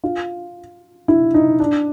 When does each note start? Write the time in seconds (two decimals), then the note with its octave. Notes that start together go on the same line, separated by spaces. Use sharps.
0.04 F4
1.08 E4
1.34 D#4
1.60 D4